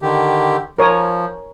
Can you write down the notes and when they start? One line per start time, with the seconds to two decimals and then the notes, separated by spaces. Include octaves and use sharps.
0.02 D3 D#3 G4
0.79 F3 A#4 C#5 D#6